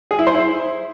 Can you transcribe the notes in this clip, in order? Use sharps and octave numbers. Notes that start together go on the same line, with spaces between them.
G#4
E4
C5
E4